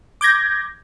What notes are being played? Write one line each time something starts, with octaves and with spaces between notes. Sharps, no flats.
D6 G6 G#6 A#6